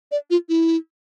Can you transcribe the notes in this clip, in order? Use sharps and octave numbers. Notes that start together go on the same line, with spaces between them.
D5
F4
E4